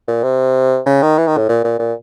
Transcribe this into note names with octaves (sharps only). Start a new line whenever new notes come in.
A#2
C3
C#3
D#3
E3
D#3
A2
A#2
A#2
A#2